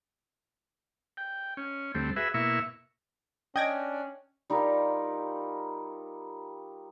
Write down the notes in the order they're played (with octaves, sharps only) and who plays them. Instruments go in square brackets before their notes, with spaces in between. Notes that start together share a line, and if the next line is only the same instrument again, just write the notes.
[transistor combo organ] G5
C#4
D2 G3 A3 C4
F#4 G#4 B4 E5
B2 A#3 E4 E5 C#6
[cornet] C#4 [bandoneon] D4 D5 [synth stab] D#5 G#6 A#6 [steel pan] G5
[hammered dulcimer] G3 D#4 F4 A#4